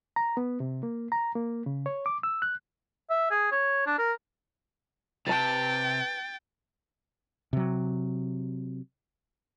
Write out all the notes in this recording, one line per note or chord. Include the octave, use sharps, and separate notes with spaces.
A#5
B3
C3
A#3
A#5
A#3
C#3
C#5
D6
E6
F#6
E5
G#4
C#5
D4
A#4
C3 B4 G5 A5 A6
C3 F#3